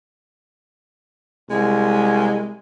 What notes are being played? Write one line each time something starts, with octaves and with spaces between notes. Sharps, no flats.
C2 G#3